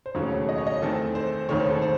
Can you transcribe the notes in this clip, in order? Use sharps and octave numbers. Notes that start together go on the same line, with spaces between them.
C5
E1 D#2 C#3 F#3 A3 C#5
D#5
C#5
D#5
E2 D#3 A3 C4 A4
C5
E1 D#2 D#3 A3 C4 C#5
C5
A4
C5